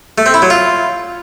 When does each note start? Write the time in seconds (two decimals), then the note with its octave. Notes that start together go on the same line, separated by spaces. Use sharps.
0.18 A3
0.26 C4
0.34 E4
0.42 F#3
0.50 F4